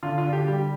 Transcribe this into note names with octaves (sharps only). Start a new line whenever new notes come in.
D3 F4
F4
D3
G4
G3 G4